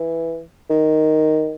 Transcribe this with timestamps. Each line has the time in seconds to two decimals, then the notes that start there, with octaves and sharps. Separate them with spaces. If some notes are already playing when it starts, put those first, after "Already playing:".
Already playing: E3
0.70 D#3